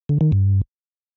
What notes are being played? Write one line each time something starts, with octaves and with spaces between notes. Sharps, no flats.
D3
D#3
G2